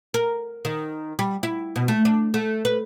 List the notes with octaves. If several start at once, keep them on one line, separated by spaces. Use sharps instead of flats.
A#4
D#3
G3
E4
B2
A3
D4
A3
B4